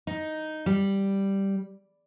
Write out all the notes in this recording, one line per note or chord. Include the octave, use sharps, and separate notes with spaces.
D#4
G3